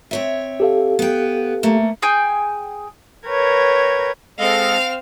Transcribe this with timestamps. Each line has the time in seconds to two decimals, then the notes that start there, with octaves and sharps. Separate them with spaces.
0.11 C4 C#5 E5
0.60 G4 A4 F5
0.99 B3 G5
1.63 A3 A#3
2.02 G#4 G5 G#5 G6
3.28 A#4 B4 C#5 G5 G#6
4.39 G#3 C4 A4 D#5 F5 F6